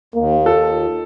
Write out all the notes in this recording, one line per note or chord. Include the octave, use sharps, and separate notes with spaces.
D#2 A#3
F4 A4